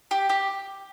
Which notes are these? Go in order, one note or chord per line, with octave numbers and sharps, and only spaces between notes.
G4
G4